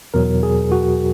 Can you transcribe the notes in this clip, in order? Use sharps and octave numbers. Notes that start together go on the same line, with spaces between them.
E2 B2 F#3 A#4
G#4
F#4